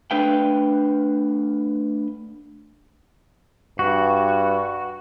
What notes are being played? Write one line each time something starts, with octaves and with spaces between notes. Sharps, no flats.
A3 D4 B4 F5 G5
G2 F#4